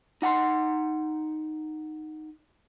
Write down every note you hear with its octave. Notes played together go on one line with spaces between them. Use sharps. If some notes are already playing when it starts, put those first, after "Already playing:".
D#4 F#5 A5 C6